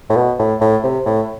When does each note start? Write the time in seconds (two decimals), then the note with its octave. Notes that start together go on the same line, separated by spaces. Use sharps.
0.10 A2
0.16 B2
0.39 A2
0.61 A2
0.83 C3
1.06 A2